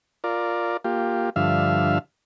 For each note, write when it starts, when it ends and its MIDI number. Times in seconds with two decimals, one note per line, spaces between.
0.24 0.77 65
0.24 0.77 70
0.24 0.77 74
0.84 1.30 58
0.84 1.30 65
0.84 1.30 67
1.36 1.98 43
1.36 1.98 50
1.36 1.98 53
1.36 1.98 76
1.36 1.98 77